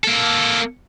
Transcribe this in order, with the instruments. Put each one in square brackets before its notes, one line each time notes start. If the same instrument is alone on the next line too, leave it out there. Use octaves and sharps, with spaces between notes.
[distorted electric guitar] A#3 A4